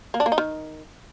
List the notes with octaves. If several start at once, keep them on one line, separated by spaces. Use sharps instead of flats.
A#3
D4
A#3
D#4
D#3